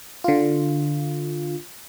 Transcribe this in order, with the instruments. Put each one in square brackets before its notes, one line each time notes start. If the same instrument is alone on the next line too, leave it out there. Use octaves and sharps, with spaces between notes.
[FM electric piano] D3 F4